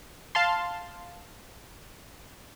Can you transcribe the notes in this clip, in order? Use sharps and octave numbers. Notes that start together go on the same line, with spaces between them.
F5 A5 C6